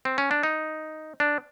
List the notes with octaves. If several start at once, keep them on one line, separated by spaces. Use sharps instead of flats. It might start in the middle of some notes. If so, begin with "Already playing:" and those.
C4
C#4
D4
D#4
D4